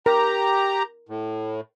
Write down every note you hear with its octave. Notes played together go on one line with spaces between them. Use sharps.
G4 A#4 A#5
A2